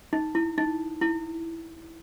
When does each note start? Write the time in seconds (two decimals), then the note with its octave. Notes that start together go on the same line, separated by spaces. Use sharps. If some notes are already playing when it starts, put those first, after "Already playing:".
0.13 D#4
0.35 E4
0.58 D#4
1.01 E4